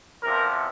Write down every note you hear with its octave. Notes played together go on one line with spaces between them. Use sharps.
E2 C3 F3 A#4